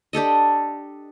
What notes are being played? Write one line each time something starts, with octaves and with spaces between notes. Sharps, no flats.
D4 G4 A4 D#5